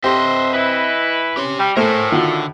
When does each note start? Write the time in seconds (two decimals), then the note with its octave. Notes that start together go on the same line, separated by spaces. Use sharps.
0.04 D3 C4 G4 B4 C5 D#5 E5
0.53 E3 E4 B4
1.37 C#4 G4 C6
1.60 G3 G5
1.77 A2 A3 A#4 C5 G#5
2.12 D3 D#3 F4 F#4